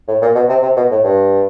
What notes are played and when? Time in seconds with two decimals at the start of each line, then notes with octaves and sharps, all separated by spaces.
0.08 A2
0.22 A#2
0.35 B2
0.49 C3
0.62 C3
0.77 B2
0.91 A2
1.04 G2